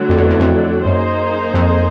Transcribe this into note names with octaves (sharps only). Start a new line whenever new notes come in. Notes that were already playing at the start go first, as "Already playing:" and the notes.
Already playing: D3 F#3 A3 D4
F2
E2
E2
F2
F#2 A#3 D#4 G#4 C5
F2